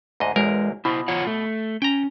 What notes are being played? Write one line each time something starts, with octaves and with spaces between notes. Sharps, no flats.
D2 G#2 D#5
A1 E2 G#3 A#4
B2 E4 C5
F4 C#5 F#5
A3
C#4 G5 A#5